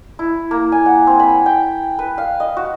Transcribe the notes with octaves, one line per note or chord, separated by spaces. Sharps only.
E4
A#3
G#5
F#5
C4
B5
G5
B4
F5
D#5
F#4